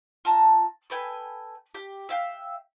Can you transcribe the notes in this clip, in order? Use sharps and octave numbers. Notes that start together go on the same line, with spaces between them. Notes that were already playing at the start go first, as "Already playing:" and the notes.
F4 A5 A#5
A4 B4 G5 G#5
G4
E5 F5 G5